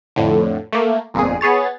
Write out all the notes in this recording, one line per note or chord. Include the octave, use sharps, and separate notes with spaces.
F2 A2 D3
A3 A#3
G1 F2 A#2 G#4
B3 G#4 C#5 A6